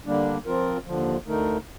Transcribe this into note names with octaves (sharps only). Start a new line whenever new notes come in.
D3 G3 A#3 D4
F3 C4 F4 A#4
D#2 D3 F3
D2 D3 A3 D#4 A#4